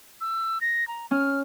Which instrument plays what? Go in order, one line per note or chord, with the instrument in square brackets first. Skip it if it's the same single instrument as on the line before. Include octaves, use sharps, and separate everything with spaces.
[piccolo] E6
A#6
A#5
[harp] C#4 [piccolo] F6